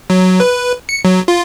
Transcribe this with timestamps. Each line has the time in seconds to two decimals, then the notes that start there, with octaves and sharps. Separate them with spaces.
0.10 F#3
0.40 B4
0.89 C#7
1.05 F#3
1.28 F4